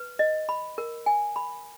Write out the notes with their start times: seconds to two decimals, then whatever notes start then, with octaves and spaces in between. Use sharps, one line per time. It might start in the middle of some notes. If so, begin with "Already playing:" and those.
Already playing: B4
0.19 D#5
0.49 B5
0.78 A#4
1.06 G#5
1.36 B5